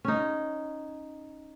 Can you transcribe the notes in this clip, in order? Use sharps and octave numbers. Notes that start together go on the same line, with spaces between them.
C#4 D#4